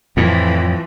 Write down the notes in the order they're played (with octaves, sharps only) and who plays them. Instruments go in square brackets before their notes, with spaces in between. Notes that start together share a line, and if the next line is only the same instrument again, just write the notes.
[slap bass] F2 A2 [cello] E3 F3